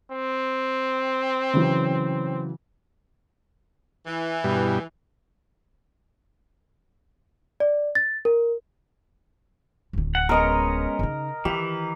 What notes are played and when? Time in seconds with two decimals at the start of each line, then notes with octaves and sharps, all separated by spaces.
0.11 C4
1.54 C#3 E3 F#3
4.05 E3
4.44 G2 B2 G3
7.60 D5
7.95 A6
8.25 A#4
9.93 D1 D3
10.15 F#5
10.29 G#3 B3 C#4 A#4 D#5 A#5
10.99 C#3 D#4
11.45 D#3 E3 G4